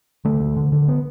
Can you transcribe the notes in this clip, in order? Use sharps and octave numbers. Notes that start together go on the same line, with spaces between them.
D3 A3
D2
D3
D3
B3